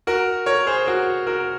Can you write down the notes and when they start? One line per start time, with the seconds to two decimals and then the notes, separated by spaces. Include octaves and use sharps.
0.07 F#4 A#4
0.46 A#4 C#5
0.67 G#4 C5
0.87 F#4 A#4
1.27 F#4 A#4